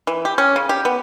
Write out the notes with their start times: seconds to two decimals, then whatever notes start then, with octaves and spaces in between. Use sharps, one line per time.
0.07 E3
0.25 G4
0.38 C#4
0.56 C#3
0.69 G4
0.85 B3